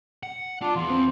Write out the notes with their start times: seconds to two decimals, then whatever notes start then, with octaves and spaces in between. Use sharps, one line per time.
0.23 F#5
0.62 D4 F4
0.76 E2 F4
0.90 C4